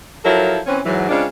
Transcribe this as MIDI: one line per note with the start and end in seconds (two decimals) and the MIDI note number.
0.25 0.59 53
0.25 0.59 54
0.25 0.59 64
0.25 0.59 69
0.25 0.59 70
0.67 0.79 52
0.67 0.79 60
0.67 0.79 61
0.85 1.06 44
0.85 1.06 52
0.85 1.06 54
1.09 1.25 49
1.09 1.25 56
1.09 1.25 60
1.09 1.25 62
1.09 1.25 65